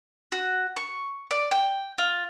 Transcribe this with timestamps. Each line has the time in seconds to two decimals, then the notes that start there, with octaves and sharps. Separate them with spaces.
0.32 F#4
0.76 C#6
1.31 D5
1.51 G5
1.98 F4